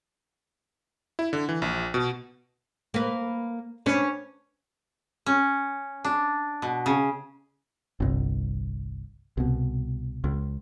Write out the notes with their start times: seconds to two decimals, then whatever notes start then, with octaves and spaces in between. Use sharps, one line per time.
1.19 E4
1.33 D3
1.49 E3
1.62 A#1
1.94 B2
2.94 A#3 B4
3.86 C#4 D4 B4
5.26 C#4
6.05 D4
6.62 B2
6.86 C#3
8.00 G1 C2
9.37 C2 B2
10.24 C#2